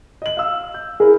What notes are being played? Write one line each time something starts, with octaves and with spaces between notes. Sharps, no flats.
D#5 F#7
F5 E6
G6
E4 G#4 A#4